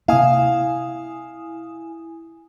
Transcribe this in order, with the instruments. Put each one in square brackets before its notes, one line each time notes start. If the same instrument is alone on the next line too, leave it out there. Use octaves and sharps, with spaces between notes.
[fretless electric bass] C3 A#3 [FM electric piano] E4 G#5 D#6 [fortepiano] F5